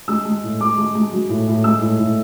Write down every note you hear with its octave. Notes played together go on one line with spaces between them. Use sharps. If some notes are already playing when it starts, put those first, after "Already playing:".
G#3 E6
G#3
A2
G#3 D6
G#3
G#3
F#3
A2
A2
G#3 E6
A2
A2